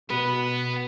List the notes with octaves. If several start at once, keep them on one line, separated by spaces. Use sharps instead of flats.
B2 B3 B4